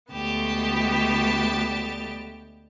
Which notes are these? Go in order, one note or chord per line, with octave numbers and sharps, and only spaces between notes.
D2 G#3 B3 G4 A5